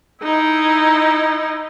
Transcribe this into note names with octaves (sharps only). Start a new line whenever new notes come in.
D#4 E4